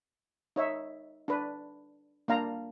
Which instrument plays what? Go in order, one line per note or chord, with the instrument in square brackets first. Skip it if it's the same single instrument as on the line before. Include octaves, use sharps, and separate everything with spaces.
[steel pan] D#4 C#5 E5
D4 B4
A#3 D4 F5 A#5